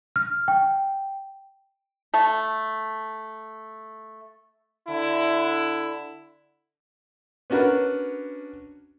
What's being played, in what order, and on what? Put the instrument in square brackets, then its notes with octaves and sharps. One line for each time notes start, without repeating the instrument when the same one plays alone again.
[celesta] F6
G5
[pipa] A3 A4
[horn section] D3 E4
[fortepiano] B3 C#4 D4 F#4 A#4 B4